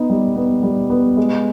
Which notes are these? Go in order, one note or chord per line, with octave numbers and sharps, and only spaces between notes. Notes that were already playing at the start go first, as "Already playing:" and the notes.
Already playing: B3 D#4
G3
B3
G3
B3
G#3